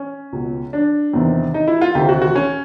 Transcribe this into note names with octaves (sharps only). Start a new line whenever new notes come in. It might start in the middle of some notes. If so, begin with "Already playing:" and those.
Already playing: C#4
C#2 B2
D4
E2 C3 D#3
D#4
E4
F4
D2 C3 D#3 G4
F#4
F#4
C#4